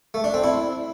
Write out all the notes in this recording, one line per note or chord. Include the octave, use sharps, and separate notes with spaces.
A3
D4
C4
E4